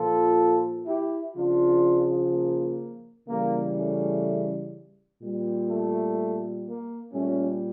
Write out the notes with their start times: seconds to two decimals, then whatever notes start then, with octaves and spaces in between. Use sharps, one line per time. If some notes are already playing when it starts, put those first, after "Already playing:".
Already playing: A#2 F3 F4 A4
0.86 E4 G4
1.34 C#3 F3 D4 F4
2.31 A#3
3.27 C#3 E3 G3 A#3
3.76 A3 C#4
5.20 A#2 G3
5.68 A3
6.66 A#3
7.13 A#2 G3 A3 C#4